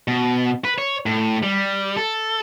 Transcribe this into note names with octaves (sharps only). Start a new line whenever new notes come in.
B2
B4
C#5
A2
G3
A4